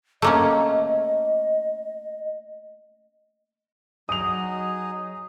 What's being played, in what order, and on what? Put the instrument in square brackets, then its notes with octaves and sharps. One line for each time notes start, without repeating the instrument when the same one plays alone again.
[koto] A3 A#3 C#4 [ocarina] D#5
[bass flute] F#3 [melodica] D#4 G#4 D#5 [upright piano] D#6 F7